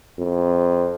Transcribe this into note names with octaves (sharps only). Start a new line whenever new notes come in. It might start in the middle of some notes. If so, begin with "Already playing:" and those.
F2